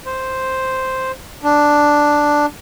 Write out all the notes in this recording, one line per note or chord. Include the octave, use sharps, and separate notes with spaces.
C5
D4